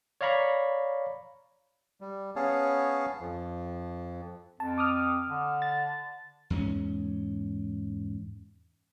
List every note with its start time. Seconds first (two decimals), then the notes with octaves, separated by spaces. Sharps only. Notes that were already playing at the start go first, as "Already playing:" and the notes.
0.21 C#5 D5 F5 A#5 B5 C#6
2.01 G3
2.36 B3 C#4 G#4 C#5 F5 A5
3.20 F2 F3
4.60 F2 A5
4.78 D6 D#6 F6
5.29 D3
5.62 A6
6.50 E2 G#2 B3 C#4